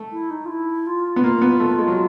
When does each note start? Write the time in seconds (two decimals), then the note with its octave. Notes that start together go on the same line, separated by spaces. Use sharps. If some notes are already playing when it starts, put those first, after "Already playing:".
Already playing: A3
0.12 E4
0.30 D#4
0.45 F4
0.49 E4
0.87 F4
1.16 B3
1.23 A#3 F4
1.42 B3
1.60 A3
1.78 G#3
1.87 F#3